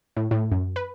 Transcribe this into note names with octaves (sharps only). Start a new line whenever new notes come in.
A2
A2
F#2
B4